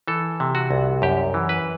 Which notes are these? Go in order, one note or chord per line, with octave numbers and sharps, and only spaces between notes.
E3 A4
C3
F#4
C2
F#2 G4
E3
B4